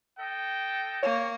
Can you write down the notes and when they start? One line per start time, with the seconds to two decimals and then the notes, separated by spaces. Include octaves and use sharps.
0.18 A4 D#5 G5
1.03 A#3 C#5